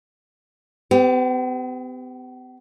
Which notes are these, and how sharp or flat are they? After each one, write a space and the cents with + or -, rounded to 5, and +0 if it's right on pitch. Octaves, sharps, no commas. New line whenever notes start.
B3 +45 G4 +0